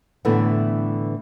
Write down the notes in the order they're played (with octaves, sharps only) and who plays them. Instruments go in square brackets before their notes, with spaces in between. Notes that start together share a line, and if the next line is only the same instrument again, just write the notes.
[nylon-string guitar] A2 D3 E3 A3 B3 E4